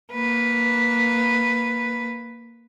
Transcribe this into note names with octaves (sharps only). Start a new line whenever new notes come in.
A#3 B4